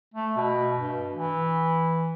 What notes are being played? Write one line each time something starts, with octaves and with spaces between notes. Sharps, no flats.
A3
B2
G2
E3